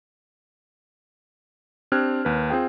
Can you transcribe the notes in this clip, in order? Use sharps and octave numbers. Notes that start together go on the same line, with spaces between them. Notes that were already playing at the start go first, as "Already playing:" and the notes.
C4 D4 G4 F6 F#6 G#6
D#2 B4
C4 F4 G#4 G5